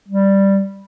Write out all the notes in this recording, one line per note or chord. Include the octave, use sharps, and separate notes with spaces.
G3